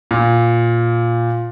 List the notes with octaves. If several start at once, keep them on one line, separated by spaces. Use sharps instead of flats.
A#2